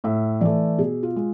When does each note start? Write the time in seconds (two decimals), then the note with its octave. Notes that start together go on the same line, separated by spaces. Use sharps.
0.04 A2 E5
0.41 E3 A3 D5
0.78 B2 G#4
1.03 F4
1.16 G#3